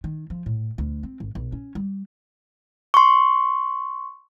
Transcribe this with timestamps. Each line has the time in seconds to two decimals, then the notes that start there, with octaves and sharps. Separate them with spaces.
0.04 D#3
0.30 F3
0.46 A2
0.78 D2
1.03 C4
1.20 G#1
1.35 B1
1.52 C#4
1.75 G3
2.94 C6 C#6